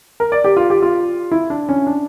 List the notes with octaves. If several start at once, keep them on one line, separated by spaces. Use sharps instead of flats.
A#4
D5
G4
F4
G4
F4
E4
D4
C#4
D4